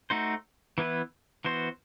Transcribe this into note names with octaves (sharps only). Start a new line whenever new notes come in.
A3 D#4 F#4 C5
E3 B3 E4 B4
E3 B3 F#4 C5